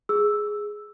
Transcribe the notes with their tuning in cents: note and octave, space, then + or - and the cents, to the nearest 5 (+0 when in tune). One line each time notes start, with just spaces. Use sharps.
G#4 +0 E6 +0